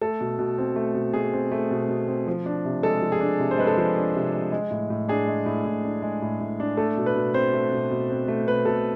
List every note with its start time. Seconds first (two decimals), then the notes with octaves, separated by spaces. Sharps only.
0.01 A3 A4
0.21 B2
0.39 B2
0.58 C4
0.76 A3
0.95 B2
1.13 B2 G#4
1.33 C4
1.52 A3
1.71 B2
1.89 B2
2.08 C4
2.27 F3
2.46 D4
2.65 C3
2.83 G#3 A4
3.02 F3
3.12 G#4
3.20 D4
3.39 C3
3.51 C5
3.58 G#3 B4
3.67 A4
3.77 F3
3.97 D4
4.15 C3
4.33 G#3
4.52 G#3
4.71 A2
4.90 A2
5.09 D4 G#4
5.27 G#3
5.46 A2
5.65 A2
5.84 D4
6.02 G#3
6.22 A2
6.41 A2
6.60 D4
6.77 A3 A4
6.97 B2
7.06 B4
7.16 B2
7.34 C4 C5
7.53 A3
7.73 B2
7.91 B2
8.10 C4
8.28 A3
8.47 B2 B4
8.65 B2 A4